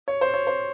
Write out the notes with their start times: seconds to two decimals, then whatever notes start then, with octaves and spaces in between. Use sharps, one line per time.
0.08 C#5
0.21 C5
0.34 C#5
0.47 C5